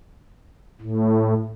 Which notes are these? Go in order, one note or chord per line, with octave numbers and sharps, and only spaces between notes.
A2